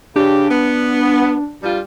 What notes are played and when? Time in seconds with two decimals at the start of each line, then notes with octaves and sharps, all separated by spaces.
0.16 C#3 D4 G4
0.50 B3
1.62 G2 G3 F4